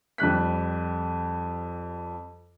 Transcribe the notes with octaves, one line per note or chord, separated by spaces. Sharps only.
F2 G3 F#6 B6